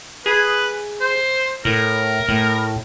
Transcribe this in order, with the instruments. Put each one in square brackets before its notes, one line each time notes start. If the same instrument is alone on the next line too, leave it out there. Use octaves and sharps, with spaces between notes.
[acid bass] G#4 [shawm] B4
[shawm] C5
[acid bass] A2 [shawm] A#4
[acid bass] A2